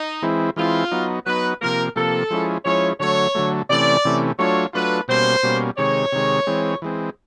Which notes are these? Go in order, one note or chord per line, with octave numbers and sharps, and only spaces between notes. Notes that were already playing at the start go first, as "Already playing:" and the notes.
Already playing: D#4
E3 G#3 C4 E4
E3 G#3 C4 E4 F4
F#3 B3 D#4
F#3 B3 D#4 B4
C3 F3 A#3 A#4
C3 F3 A#3 A4
F3 G#3 C#4 E4
F3 G#3 C#4 E4 C#5
D3 F#3 A3 C#5
D3 F#3 A3
C3 E3 A3 C#4 D5
C3 E3 A3 C#4
F#3 A3 D4 F4 C#5
F#3 A3 D4 F4 B4
B2 G3 A#3 C#4 C5
B2 G3 A#3 C#4
C3 D#3 G#3 C#5
C3 D#3 G#3
E3 G#3 C4
E3 G#3 C4